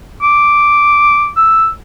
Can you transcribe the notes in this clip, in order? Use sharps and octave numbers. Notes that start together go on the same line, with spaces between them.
D6
E6